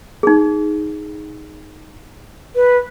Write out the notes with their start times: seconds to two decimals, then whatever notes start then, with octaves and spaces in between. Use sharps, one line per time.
0.23 D#4 G#4
2.55 B4